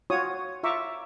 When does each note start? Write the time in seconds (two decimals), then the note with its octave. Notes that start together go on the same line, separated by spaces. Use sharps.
0.10 F4 F#4 C#5 D#6
0.63 F4 E5 A#5 C#6 D6